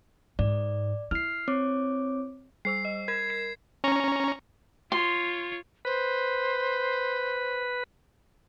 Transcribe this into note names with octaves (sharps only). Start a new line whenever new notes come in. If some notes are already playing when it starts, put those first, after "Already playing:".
G#2 D5
E4 F6 C7
C4 C#5 D6
G3 C5 E6 C7
D#5
A#4 G#6 E7
C7
C#4 A#5 C#6
F4 C#5 C6
B4 C5